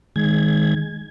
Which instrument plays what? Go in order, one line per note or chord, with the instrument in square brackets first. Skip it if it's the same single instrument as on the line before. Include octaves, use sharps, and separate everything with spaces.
[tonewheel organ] D#3 G#3 G#6